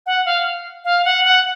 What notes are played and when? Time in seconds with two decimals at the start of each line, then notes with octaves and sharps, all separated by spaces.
0.06 F#5
0.25 F5
0.85 F5
1.05 F#5
1.25 F#5